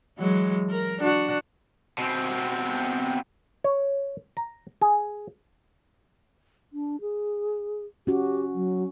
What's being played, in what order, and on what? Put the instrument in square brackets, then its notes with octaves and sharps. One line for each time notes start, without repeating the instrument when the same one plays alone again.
[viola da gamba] E3 F#3 G#3
A#4
D4 F#4
[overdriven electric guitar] B2 C4
[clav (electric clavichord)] C#5
A#5
G#4
[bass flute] D4
G#4
[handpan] C#4 F#4 [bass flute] G4
[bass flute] F#3